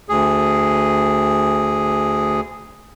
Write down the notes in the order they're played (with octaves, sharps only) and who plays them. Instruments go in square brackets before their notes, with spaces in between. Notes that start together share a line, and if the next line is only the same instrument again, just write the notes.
[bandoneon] D2 G#4